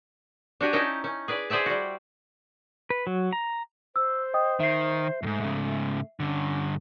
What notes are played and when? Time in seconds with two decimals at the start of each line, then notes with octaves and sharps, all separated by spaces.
0.61 D4 F#4 G4 G#5
0.73 C#4 D#4 E4 G5 A5 A#5
1.04 C#4
1.28 G#4 B4 D5
1.50 G#4 C5 D5 E5 A5
1.66 G3 F#4
2.90 B4
3.07 F#3
3.33 A#5
3.96 C5 E6
4.34 D#5 G5 D#6
4.60 D#3 E5 C7
5.23 F2 G#2 A3
5.41 G#2 C#3
6.20 G2 D3 C#4